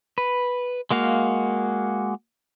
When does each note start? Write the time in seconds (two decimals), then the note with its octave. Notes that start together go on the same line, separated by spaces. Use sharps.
0.18 B4
0.91 G#3 A#3 F#4 F5